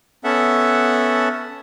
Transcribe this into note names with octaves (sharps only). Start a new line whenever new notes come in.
B3 C#4 A4 E5 F#5